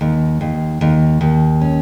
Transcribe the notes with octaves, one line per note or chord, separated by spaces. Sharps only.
D#2
D#2
D#2
D#2
C#4